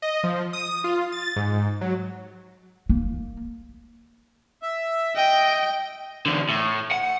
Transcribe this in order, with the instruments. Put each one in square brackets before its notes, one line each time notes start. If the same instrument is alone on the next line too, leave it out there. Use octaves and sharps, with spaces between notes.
[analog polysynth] D#5
F3
D#6
F4
A6
G#2
F#3
[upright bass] A#3
[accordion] E5
[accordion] D#5 [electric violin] G5
[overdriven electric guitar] E2 D3
A2
F#5